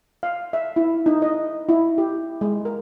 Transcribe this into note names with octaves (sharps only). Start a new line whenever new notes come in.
F5
E5
E4
D#4
D#5
E4
G4
G#3
A#4